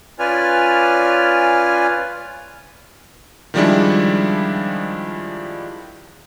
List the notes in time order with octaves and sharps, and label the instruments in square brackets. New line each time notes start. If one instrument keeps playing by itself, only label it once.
[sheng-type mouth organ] C#4 F4 B4 D5 G#5 F6
[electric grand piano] D#3 F3 G3 G#3 D4 E4